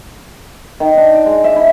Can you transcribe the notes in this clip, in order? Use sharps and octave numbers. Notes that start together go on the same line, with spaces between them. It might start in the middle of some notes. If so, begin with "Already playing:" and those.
D#3
D4
D6
G#3
E5
E4